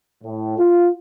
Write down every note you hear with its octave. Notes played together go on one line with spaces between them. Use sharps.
A2
F4